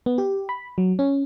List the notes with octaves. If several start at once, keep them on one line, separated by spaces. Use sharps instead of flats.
B3
G4
B5
F#3
C#4